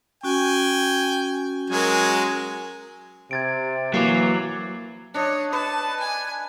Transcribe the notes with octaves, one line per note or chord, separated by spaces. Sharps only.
C#4 F#4 G5 G#5
F#3 G#3 A#4 G#5
C3 G#6 A6 D7
E3 F#3 A#3 D6 C7
D4 C#5 D#5
B4 A5
G#5